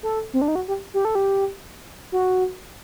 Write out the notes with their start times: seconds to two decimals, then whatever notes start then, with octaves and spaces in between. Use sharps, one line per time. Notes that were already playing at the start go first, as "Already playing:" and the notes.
0.03 A4
0.33 C4
0.41 D4
0.48 D#4
0.55 F#4
0.68 G4
0.94 G4
1.05 A4
1.15 G4
2.12 F#4